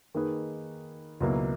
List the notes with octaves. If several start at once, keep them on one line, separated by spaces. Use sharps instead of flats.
D#3 A#3 D#4 G#4 B4
C#2 B2 F#3 A#3 E4